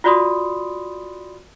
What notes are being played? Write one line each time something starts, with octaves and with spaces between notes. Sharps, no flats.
F4 F#4 D5 B5 C6 D#6